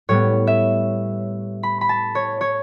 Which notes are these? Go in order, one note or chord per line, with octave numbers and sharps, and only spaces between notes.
A2 G3 B3 C#5
E5
B5
B5
A5
C#5
C#5